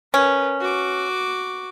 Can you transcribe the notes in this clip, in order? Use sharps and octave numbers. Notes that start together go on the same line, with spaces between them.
C#4 A#4 B4
F#4 D6